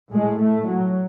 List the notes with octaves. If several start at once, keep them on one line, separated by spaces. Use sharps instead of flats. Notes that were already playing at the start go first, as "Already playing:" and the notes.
A2 G#3
A3
F#3